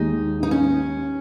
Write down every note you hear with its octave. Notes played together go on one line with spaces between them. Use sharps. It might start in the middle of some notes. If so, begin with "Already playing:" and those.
Already playing: D#2 D#3 G#3 D#4
D#4
C#4